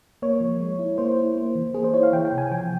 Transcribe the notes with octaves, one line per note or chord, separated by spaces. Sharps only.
A#3 C#5
F3
G#3
E4
A#3 C5
E4
A#3
E3
A#3 G#4
C5
E4 C#5
F5
E3 G5
G5
C3
G#5
F3 G5